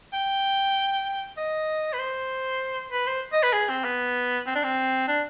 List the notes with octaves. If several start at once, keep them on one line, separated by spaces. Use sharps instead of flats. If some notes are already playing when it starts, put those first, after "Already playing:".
G5
D#5
B4
C5
B4
C5
D#5
B4
G#4
C4
B3
C4
D4
C4
D4